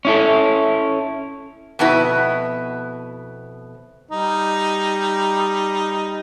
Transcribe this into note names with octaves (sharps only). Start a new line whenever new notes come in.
C#4 E4 A4
F2 B2 B3 E4
G3 D#4